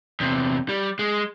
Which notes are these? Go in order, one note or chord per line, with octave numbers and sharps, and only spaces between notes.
E2 C3
G3
G#3